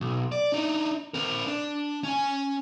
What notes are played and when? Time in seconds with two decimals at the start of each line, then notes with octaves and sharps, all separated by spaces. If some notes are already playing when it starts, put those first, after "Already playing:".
0.01 B1
0.32 D5
0.52 D4 D#4
1.14 C4 A#4
1.47 D4
2.03 C#4 G#5